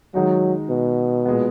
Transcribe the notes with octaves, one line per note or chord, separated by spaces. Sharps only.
D#3 F#3 G#3 D#4 F#4
B2
A#2 G#3 B3